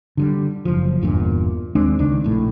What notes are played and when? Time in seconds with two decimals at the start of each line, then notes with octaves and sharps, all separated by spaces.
0.17 D3 F#3 G3
0.65 F#1 F3
1.01 G1 E2 G2 A#2
1.75 D#2 G#3 C4 D4
1.99 C#2 D#3 D4
2.24 A#1 A2